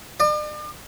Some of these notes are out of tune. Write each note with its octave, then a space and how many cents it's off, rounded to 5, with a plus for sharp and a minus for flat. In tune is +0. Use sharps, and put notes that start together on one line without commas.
D5 +45